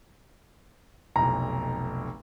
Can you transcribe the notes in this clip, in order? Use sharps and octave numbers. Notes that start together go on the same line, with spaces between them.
F1 B1 A#5